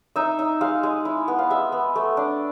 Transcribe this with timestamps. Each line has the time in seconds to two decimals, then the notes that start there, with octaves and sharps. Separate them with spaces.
0.16 D#4 E5
0.39 D#4
0.61 G#3 F5
0.83 G#3
1.05 E4
1.28 B3
1.39 F5
1.50 G#3 E5
1.72 B3
1.96 A3
2.17 D4